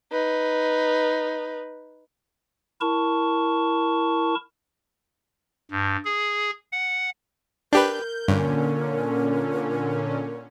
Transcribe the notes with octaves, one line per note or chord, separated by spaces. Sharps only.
D#4 B4
E4 A#4 A5 C#6
G2
G#4
F#5
D4 G4 A#4 B4 G6
G2 A#2 D3 C#4